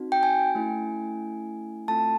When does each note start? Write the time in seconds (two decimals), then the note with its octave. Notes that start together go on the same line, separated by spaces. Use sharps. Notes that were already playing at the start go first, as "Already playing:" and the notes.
Already playing: C4 D#4 F#4
0.12 G5
0.23 G#5
0.55 A3 C#4 E4
1.88 A3 C4 F4 A4 A5